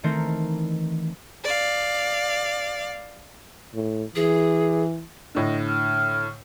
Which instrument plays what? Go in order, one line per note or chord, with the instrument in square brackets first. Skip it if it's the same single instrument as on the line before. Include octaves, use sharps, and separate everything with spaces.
[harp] D#3 E3 A3 C4 A#4 C5
[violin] D5 F5
[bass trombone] A2
[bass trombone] E3 [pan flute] G#4
[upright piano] A2 D3 [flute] D#5
[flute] F6